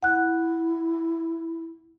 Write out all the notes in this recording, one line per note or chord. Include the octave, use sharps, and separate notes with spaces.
E4 F#5 F#6